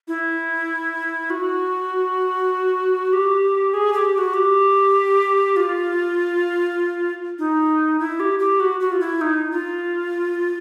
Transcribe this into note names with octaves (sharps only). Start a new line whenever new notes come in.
E4
F#4
G4
G#4
G4
G4
F#4
G4
F4
D#4
E4
G4
G4
F#4
F#4
F4
E4
D#4
F4